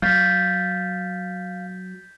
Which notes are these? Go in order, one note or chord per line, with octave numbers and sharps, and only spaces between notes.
F#3 F5 G6 A6 B6